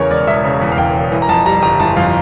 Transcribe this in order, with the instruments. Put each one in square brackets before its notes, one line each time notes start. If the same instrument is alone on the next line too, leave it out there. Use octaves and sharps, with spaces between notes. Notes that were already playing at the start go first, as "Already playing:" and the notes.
Already playing: [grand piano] E2 C#3 A#4 C#5
E1 D5
E1 E5
C#3
E2
F5
E1 G5
E1
E3
A#5
F2 A5
G3 A#5
G1 A#5
E3 A5
F2 F5